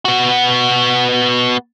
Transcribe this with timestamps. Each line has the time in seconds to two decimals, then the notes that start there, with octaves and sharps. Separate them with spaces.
0.05 B3 F#4